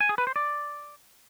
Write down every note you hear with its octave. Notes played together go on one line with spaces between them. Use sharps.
G#5
G#4
B4
C5
D5